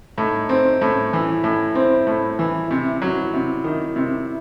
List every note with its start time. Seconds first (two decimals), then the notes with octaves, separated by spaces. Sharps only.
0.18 A2 D#4
0.49 C4
0.81 A2 C#4
1.13 E3 E4
1.44 A2
1.75 C4
2.07 A2
2.39 E3
2.70 C3 E4
3.01 F#3 E4
3.34 C3
3.64 D#3
3.96 C3